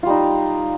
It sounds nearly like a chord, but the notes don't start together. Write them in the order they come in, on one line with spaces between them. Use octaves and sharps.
F4 G3 D#4